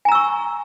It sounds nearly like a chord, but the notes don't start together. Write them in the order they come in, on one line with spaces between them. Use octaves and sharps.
G#5 A#5 E6 C#6